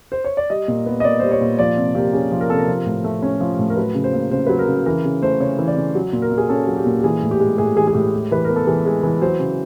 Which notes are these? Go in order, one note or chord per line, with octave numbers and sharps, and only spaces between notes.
C5
C#5
D5
G3 D#5
A#2
B3
D#5
A#2 D5
G3 C5
C#5
A#2
F3 D5
C3
A#3 G4
C#4 G#4
F3
A#4
C3 A4
A#4
F3
A2
A3
C#4
F3
A2
A#4
F#3 B4
C#3
C5
A#3
C#3 C5
F#3 B4
A#4
C#3
E3 A#4
C#3
A3 C5
C#3 C#5
E3
D5
C#3
F#3
A#2
A#4
A#3
G#4
C#4 A4
F#3
G4
A#2
G4
E3 G#4
A2
G4
G#3
A2 G#4
E3 G#4
G#4
A2 G4
G#3
E3 B4
B3 A#4
A4
E3 G#4
G#3
E3
F#3 C5
C#3